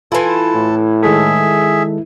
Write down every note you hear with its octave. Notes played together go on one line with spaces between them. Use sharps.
E3 E4 F4 A4 G#5 C6
A2
D#3 G#3 G#4 A4 E5